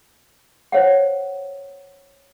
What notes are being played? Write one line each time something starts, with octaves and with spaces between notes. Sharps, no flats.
C5 C#5 F5 F#5